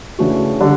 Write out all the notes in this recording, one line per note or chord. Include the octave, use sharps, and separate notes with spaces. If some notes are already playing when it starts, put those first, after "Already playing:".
C#3 E3 A3 D4 F#4
D3 G3